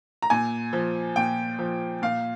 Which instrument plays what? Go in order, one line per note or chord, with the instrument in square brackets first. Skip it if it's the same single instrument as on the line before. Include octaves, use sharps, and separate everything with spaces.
[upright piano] A#5
A#2 G#5
F3
A#2 G5
F3
A#2 F5